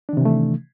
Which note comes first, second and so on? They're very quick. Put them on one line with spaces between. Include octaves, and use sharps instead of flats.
D4 D#3 C3 E3 A3